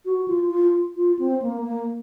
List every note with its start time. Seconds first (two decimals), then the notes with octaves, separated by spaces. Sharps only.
0.05 F#4
0.28 F4
0.50 F4
0.96 F4
1.19 C4
1.42 A#3
1.65 A#3